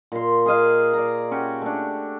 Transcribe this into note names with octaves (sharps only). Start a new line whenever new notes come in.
A#2 C6
G#4 A#4 D#5 F5
D5 A#5
C#4 F#4 G4
A3 D4